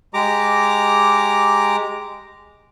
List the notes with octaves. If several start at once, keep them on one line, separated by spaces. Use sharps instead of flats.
G#3 G4 A#5 D6